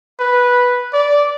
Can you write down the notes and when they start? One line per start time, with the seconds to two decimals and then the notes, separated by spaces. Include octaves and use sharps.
0.20 B4
0.93 D5